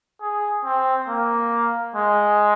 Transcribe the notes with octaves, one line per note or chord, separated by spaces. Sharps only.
G#4
C4
A#3
G#3